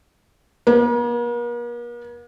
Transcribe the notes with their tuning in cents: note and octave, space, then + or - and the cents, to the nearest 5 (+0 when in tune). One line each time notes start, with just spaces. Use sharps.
A#3 +45